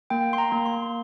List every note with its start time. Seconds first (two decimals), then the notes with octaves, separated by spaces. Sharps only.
0.10 A#3 G5
0.33 C6
0.38 A#5
0.52 A#3
0.66 C6